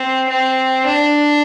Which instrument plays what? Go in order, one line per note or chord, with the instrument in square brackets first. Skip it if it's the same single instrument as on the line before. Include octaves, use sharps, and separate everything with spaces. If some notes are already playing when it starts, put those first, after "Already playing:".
Already playing: [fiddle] C4
C4
D4